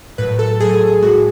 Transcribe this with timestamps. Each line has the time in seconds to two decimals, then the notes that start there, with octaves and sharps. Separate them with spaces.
0.18 A2 F#3 B4
0.39 A4
0.60 A2 F#3 G#4
1.02 G#3 F#4
1.05 A2